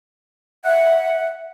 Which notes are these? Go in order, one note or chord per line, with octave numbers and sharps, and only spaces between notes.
E5 F#5